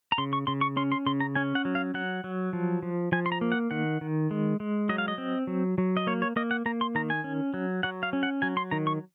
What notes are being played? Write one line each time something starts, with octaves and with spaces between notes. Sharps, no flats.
A#5
C#3 C6
C#6
C#3 C6
C#6
C#4 C6
C6
C#3 C6
A#5
C#4 G#5
F#5
F#3
F5
F#3 F#5
F#3
F3
F3
F3 G#5
C6
A#5
A#3
F#5
D#3 F#5
D#3
G#3
G#3
F#3 D#5
F5
D#5
C4
F#3
F#3
D#5
A#3 C#5
C#5
A#3 D#5
F#5
A#3 A#5
C6
D#3 A#5
G#5
C#4
F#3
F#3 F#5
F5
C#4
F#5
F#3 G#5
C6
D#3 A#5
C#6